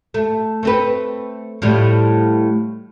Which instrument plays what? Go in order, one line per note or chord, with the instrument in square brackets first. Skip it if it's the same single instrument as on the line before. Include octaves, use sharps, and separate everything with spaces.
[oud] A3
A3 C4 B4
A2 F3 G3